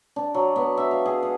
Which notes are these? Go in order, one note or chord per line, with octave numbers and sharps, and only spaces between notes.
D4
F#3
B3
E5
F5
G#4
F#5